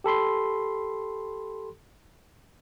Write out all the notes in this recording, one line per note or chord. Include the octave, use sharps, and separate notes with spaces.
G4 A4 B5 C6